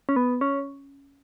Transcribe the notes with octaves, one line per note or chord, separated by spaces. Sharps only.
C#4
B3
C#4